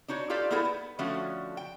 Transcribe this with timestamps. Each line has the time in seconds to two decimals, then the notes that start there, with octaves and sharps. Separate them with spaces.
0.08 D4 D#4 F#4 C#5
0.30 F4 G4 A4 D5 F5
0.51 A#3 B3 D#4 E4 G#4 A4
0.65 B3
0.99 D3 F3 A3 C#4 F#4 E5
1.57 G5